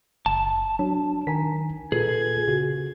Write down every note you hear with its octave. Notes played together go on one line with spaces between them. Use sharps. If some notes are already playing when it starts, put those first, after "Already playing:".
F#1 A5
F#3 D4
D#3 G#5 A#5 B6
A#2 F4 G#4 A4 B4 G#6
C#3 F#4